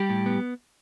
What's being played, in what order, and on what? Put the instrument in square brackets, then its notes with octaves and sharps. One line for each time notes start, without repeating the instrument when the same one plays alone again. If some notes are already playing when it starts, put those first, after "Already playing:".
Already playing: [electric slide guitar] G3 G4
A2
B3